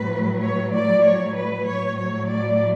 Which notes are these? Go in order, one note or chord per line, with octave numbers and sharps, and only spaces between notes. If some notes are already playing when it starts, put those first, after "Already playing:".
Already playing: A2 F#3 B4
C#5
D5
C#5
B4
A2 F#3 C#5
C#5
D5